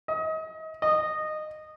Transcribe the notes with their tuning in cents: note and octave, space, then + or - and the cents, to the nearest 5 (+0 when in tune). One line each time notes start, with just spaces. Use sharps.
D#5 +35
D#5 -15